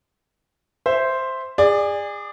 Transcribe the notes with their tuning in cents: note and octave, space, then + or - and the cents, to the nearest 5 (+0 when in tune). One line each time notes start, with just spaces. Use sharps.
C5 +0 E5 +0
G#4 -25 D5 +15